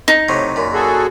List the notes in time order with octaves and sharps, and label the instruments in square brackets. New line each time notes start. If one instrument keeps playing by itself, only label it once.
[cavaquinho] D#4
[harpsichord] A2 C3 F#3
F#2 A#2
[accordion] F#4 G#4 A4